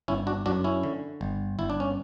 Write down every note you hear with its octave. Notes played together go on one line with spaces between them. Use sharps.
G1 C#4 E4
D4 F#4
F#2 D4 F#4
C#4 E4
D3
G1
G1 E4
D4
C#4